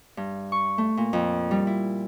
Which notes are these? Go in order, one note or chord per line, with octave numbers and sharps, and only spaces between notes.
G2
C#6
A3
A#2
F2
G3
E4